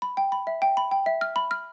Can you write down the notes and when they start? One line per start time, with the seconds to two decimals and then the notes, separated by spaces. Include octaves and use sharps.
0.02 B5
0.17 G5
0.32 B5
0.47 E5
0.62 G5
0.77 B5
0.91 G5
1.06 E5
1.21 F6
1.36 B5
1.51 F6